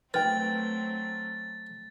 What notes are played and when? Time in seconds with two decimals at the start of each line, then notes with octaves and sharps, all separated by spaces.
0.14 F#3 A3 C4 B4 G5 F6 A6